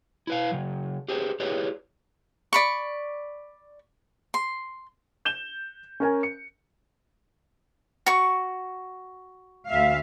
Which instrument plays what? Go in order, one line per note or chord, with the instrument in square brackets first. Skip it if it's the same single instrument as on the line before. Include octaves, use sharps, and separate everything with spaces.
[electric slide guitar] E4 B4 F5
C#3 F#3
G4 G#4 B4 C5
E4 G4 G#4 B4 C#5 D5
[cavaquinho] D5 B5 C#6
C6
[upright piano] G6 E7 G7
C#4 A#4 G#5
C#7
[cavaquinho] F#4 C#6
[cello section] D2 E5 F5